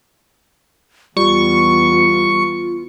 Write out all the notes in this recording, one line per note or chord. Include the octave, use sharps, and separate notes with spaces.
E2 G3 B3 F4 C#6